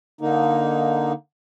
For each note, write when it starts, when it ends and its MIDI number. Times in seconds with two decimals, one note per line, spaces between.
0.21 1.13 50
0.21 1.13 58
0.21 1.13 63